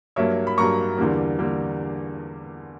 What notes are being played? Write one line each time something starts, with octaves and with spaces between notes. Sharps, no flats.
G2 F#3 A#3 C#5 E5
B5
G2 F#3 A#3 A#5 C#6
E2 D3 G3 A#3
D3 G3 A#3